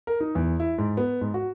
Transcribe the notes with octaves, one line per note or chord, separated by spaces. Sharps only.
A#4
D#4
E2
E4
G#2
B3
G#2
F#4